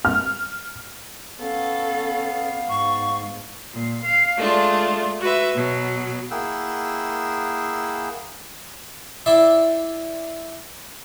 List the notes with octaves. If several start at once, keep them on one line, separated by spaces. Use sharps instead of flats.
F6
B3 C#4 A4 F5
G#2 C#6
A#2
F5
G#3 A3 D4 F4
F#4 B4 E5
B2 F#3
A#3 E4 G#4 F#5 G5 E6
E4 D5 E5 C6